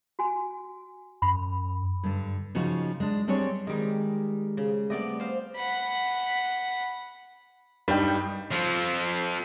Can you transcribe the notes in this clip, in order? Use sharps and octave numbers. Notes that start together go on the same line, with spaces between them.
F#4 G#5
F#2 B5
G2 D3
C#3 F3 D#4 F#4
G#3 D4
G3 C4 D4 G#4 C#5
D#3 G3 G#3 D#4 G#4
C#3
G3 A3 B3 C4 D5 D#5
C5 F5
F#5 B5
G2 G3 D4 D#4 G5
F3 C4